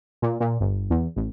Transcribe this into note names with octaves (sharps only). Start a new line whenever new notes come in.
A#2
A#2
G1
E2
A1